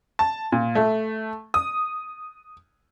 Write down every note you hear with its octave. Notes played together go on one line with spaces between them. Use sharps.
A5
A#2
A3
D#6